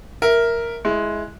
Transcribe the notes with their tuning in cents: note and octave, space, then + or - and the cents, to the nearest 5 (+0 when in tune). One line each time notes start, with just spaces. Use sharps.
A#4 +0 E5 +0
G#3 +10 E4 +0